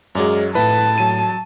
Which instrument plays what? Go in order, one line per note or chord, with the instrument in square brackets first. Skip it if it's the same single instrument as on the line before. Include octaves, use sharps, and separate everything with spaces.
[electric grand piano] F#2 F#3 [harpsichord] G#3 D5 F5
[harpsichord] A2 [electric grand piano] E4 B4 [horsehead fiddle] A5
[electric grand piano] F#3 D#7